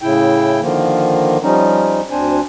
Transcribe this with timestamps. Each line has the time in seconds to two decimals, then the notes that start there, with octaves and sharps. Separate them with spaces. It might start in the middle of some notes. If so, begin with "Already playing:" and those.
0.02 A2 C#3 E4 G5
0.61 D3 D#3 F3 A#3
1.43 F3 G3 C#4 D#4
2.11 D2 C4 D4 C5 G#5